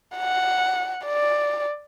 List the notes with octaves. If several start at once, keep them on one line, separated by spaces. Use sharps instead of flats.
F#5
D5